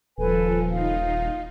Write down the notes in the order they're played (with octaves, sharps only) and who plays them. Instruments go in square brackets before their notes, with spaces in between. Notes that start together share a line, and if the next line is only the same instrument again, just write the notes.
[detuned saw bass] D#1 [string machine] F3 [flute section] A4 B4 G#5
[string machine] D#4 [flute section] F4 F5